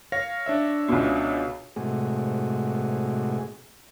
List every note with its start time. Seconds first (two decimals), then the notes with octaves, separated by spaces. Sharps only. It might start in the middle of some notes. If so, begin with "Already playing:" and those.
0.12 C#5 F5 A#6
0.46 D4 C#5 E5
0.88 C#2 B2
1.76 A2 C3 G#3 A3 F#4 G#4